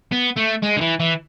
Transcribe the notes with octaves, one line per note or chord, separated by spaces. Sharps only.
B3
A3
G#3
D3
E3
E3